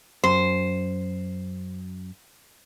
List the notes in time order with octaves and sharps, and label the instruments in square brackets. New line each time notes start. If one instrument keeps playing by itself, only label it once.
[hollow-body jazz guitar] F#2 [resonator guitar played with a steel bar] C5